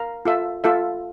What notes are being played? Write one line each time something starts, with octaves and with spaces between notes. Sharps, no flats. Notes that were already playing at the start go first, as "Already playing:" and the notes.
Already playing: A#4 F5 A#5
F4 A4 E5
F4 A4 E5